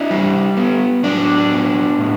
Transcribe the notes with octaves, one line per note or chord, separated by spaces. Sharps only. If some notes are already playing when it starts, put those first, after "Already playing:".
Already playing: D4 E4
G3
B3
F#3 D4
B3
A2